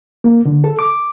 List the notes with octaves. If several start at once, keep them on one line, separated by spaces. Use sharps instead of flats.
A#3
D3
A4
D6